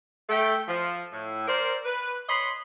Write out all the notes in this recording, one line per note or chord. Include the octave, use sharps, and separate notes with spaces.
A3 G5
F3
A2
A#4 C5 D5
B4
C#5 D#5 B5 C6